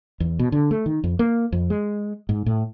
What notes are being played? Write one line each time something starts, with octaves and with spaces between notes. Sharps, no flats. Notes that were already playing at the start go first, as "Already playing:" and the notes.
E2
B2
D3
A3
D#3
F2
A#3
F2
G#3
G#2
A2